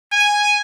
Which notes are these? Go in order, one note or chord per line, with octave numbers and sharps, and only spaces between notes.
G#5